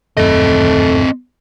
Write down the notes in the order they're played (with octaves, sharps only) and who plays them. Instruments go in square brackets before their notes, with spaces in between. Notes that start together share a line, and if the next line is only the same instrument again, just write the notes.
[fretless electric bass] D#1 F#2 D#3 [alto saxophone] A3 [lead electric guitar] C4 D#5